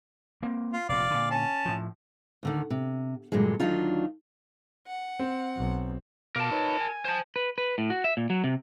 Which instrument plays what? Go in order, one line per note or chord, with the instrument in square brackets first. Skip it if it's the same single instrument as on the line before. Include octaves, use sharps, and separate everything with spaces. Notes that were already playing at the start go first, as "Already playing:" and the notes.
[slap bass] A#3 C4
[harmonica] F4
[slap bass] F1 A#2 [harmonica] D5 F5
[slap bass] A#2 D3
[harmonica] C#4 A5
[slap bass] A2 F3
[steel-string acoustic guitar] D2 D3 D#3
C3
G2 A#2 D3 F#3 G#3
D2 D#3 F#3 D4 D#4 F4
[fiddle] F#5
[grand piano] C4
[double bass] B1
[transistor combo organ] B2 F5 D6 [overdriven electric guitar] A#4 A5
[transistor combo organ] D#4 B4 C#5
G#5
[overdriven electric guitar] C5 A5
[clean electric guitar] B4
B4
A2
F#4
E5
A#2
F#3
C3